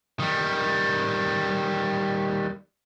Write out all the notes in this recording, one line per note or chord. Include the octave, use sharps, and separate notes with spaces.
D#3 G3